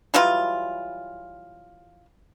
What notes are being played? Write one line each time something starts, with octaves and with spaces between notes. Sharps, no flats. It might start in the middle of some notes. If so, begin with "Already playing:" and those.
E3 F#3 G3 F4